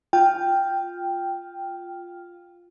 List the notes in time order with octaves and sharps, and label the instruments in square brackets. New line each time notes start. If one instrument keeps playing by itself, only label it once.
[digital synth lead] F4 [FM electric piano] G5